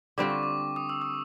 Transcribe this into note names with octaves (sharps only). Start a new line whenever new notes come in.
D3 G3 C4 F4 D6
C#6
D6
D#6
E6
D#6